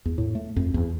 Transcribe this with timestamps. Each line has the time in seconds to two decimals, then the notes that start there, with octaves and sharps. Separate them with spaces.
0.05 E2
0.18 A2
0.35 A3
0.56 F2
0.74 E2